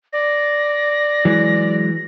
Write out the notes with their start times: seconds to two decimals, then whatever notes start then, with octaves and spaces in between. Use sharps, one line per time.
0.13 D5 A#6
1.25 E3 F#3 G#3